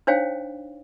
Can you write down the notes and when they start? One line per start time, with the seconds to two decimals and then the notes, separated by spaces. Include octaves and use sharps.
0.07 D4 D#4 C5 C#5 F5 G5